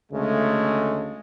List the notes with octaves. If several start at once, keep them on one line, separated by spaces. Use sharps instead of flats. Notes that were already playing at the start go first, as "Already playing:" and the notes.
D2 C#3 G#3 A3